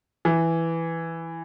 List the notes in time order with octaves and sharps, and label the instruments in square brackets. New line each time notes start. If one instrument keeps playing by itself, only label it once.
[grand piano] E3